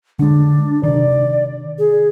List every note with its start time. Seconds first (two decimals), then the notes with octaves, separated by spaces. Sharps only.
0.19 D3 G#3 D4
0.83 C3 D#3 D5
1.79 G#4